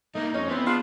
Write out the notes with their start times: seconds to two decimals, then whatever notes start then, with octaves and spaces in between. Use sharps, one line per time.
0.15 A3 A#3 D#4
0.34 F2 C#4 D#4
0.48 E3 B3 C4
0.66 D4 F4 G#4